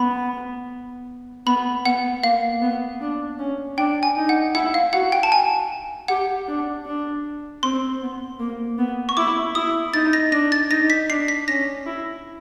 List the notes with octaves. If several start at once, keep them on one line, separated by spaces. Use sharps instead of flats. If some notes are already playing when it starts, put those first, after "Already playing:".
Already playing: B3 B5
B3 B5
B3 F#5
A#3 F5
B3
D4
C#4
D4 G5
G#5
D#4
F#5
E4 F#5
F5
F#4 F#5
G5
A5
G#5
G4 F#5
D4
D4
C4 C6
B3
A#3
B3
C#6
E4 D6
E4 D#6
D#4 A6
A#6
D4 A#6
A6
D#4 A#6
B6
D4 C7
B6
C#4 A#6
E4